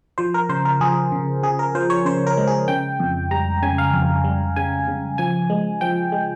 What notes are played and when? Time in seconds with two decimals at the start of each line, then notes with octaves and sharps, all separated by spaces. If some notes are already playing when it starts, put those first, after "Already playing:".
0.18 F3 C5
0.34 A#4
0.49 C#3 C5
0.65 A#4
0.80 F3 G#4
1.12 C#3
1.43 C#3 G#4
1.59 A#4
1.75 F3 C5
1.90 C#5
2.05 C#3 C5
2.27 A#4
2.37 G#3
2.47 G#4
2.68 C#3 G5
3.00 F2
3.31 G3 A#5
3.63 C#3 G#5
3.78 F5
3.93 F2
4.24 G3
4.56 C#3 G#5
4.88 C#3
5.18 F3 G#5
5.50 G#3
5.81 F3 G5
6.12 G#3